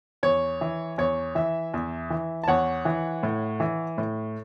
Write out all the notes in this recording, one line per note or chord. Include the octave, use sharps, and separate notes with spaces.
E2 C#5
E3
E2 C#5
E3 E5
E2
E3
A5
E2 C#5 F#5
E3
A2
E3
A2